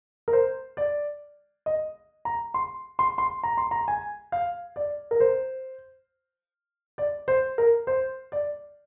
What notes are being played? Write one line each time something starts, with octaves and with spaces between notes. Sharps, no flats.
A#4
C5
D5
D#5
A#5
C6
C6
C6
A#5
C6
A#5
G#5
F5
D5
A#4
C5
D5
C5
A#4
C5
D5